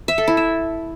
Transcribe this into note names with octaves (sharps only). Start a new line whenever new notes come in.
E5
A4
E4
E5